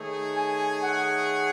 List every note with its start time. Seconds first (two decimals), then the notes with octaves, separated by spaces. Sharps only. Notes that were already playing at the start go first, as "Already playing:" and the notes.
Already playing: D#3 A3 D#4 G#4 C#5
0.36 G#5
0.83 F#5